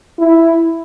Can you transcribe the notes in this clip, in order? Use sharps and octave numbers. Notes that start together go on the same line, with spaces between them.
E4